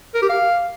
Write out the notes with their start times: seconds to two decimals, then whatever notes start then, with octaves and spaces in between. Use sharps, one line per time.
0.14 A#4
0.22 G4
0.30 F5